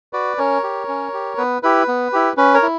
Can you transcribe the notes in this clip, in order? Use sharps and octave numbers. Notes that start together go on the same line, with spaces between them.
F#4 B4 D5
C#4 A#4 C#5
G4
C#4
G4
B3 B4
E4 G4 B4
B3
E4 G4
C#4 B4
A#4 C#5
E4